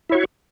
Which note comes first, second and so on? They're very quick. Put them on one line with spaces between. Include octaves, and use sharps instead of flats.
E4 C#5 F#4